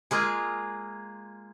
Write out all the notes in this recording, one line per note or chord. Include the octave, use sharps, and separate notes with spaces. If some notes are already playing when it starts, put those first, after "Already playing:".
G#3 A#3 F4 G#4